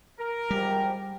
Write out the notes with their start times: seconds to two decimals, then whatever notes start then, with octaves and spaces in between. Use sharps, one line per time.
0.19 A#4
0.51 G#1 F3 G3 G4